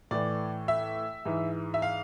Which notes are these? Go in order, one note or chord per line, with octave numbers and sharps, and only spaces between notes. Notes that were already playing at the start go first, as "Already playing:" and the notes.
A2 E3 D5
E5
G#2 E3
E5
F5